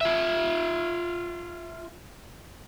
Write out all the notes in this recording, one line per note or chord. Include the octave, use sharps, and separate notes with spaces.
F4 E5